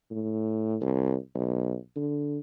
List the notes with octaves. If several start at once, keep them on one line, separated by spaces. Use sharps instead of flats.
A2
C2
B1
D3